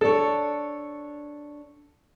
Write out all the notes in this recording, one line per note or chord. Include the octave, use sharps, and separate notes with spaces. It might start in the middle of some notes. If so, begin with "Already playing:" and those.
D4 A4 C#5